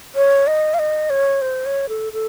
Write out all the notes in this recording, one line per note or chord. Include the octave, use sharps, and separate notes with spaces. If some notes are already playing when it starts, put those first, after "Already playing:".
C#5
D#5
F5
D#5
C#5
C5
C#5
A4
A4